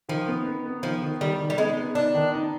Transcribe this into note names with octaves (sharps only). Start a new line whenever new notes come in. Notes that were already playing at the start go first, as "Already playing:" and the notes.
D#3 F3
B3
B3
B3
D#3 F3
D#3
D#3 G3
D#3
G3
G#3 B3
B3
D4 D#4
D#3
D#4